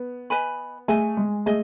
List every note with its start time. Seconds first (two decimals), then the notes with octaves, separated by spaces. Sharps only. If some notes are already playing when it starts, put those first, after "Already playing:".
Already playing: B3
0.30 B4 D#5 G#5 B5
0.88 A3 G#4 D#5 G#5
1.17 G#3
1.46 A3 G#4 D#5